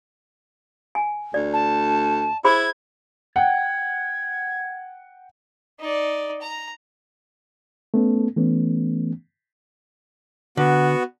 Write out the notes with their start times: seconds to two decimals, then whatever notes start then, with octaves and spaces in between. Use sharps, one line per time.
0.95 G#5
1.34 D2 D5
1.53 A5
2.44 E4 G#4 C5 B5 G#6
3.36 F#5 G5 G#6
5.79 D#4 D5
6.41 A#5
7.94 A3 B3 C#4 A4
8.36 E3 A3 B3 C#4
10.57 D3 B3 F#4